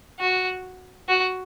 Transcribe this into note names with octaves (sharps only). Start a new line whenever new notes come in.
F#4
F#4